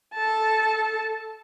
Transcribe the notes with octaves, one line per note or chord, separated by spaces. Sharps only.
A4 A5